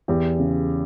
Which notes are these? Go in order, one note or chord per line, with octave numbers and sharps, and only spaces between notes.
E2 G4
C#3